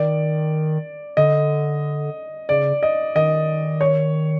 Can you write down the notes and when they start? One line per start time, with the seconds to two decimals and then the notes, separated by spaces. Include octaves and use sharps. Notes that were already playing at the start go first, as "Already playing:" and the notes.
Already playing: D#3 D5
1.17 D3 D#5
2.49 C#3 D5
2.83 D#5
3.15 D#3 D#5
3.81 C#5